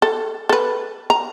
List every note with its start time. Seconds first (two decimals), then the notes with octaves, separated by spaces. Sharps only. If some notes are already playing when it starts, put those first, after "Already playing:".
0.02 A4
0.49 A4 B4
1.10 A#5